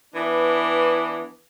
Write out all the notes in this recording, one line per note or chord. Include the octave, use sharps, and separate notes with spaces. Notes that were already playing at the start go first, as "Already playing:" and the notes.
E3 B3 D4